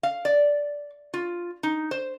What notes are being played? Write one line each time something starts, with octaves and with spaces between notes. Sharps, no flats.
F5
D5
F4
D#4
C5